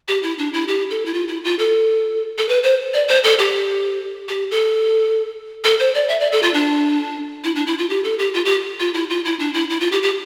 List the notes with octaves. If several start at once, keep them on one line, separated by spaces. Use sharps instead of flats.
G4
E4
D4
E4
G4
A4
E4
F4
E4
F4
A4
A4
B4
C5
D5
C5
A4
G4
G4
A4
A4
C5
D5
E5
D5
A4
F4
D4
E4
D4
E4
F4
G4
A4
G4
F4
G4
F4
E4
F4
E4
D4
E4
E4
F4
G4
G4